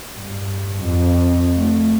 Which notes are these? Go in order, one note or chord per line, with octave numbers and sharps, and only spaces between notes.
G2
F2
A3